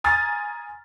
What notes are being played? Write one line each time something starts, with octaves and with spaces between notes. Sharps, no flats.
G#5 A#5 C6 D#6 F6 A6